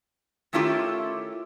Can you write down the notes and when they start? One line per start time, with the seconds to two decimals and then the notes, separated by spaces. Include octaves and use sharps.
0.53 D#3 A3 C#4 E4 F4 G4